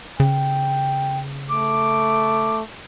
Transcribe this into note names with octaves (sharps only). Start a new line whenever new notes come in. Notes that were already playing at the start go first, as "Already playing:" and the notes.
C#3 G5
A3 D6